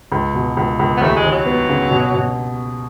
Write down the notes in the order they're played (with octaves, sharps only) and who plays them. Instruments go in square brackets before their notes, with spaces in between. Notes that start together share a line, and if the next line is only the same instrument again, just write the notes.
[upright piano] C#2
B2
C#2
C#2
[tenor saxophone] B3
[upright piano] D#2 [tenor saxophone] A3
[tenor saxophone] G#3
[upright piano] D#2
[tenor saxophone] F#3
[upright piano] B3
C#3
B2
B2